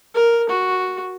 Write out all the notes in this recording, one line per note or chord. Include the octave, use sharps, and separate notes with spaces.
A#4
F#4